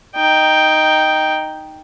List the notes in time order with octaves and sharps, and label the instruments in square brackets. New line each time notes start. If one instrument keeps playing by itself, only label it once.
[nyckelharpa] D#4 G5